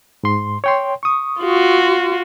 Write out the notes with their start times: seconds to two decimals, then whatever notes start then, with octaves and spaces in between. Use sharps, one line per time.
0.23 G#2 C6
0.64 C#5 G5 C6
1.03 C#6 D#6
1.41 F4 F#4